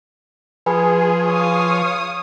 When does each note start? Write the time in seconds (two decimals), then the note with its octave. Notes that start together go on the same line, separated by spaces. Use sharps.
0.66 F3 G#4 B4 G#5 B5
1.24 C#5 F5 D#6